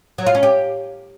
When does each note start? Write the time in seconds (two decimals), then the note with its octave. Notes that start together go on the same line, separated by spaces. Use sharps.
0.18 F#3
0.26 F4
0.35 C#4
0.43 G4